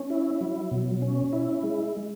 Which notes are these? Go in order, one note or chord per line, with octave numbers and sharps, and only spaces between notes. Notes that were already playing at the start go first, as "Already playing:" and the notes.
Already playing: C#4
E4
F#3
B2
C#4
E4
G#3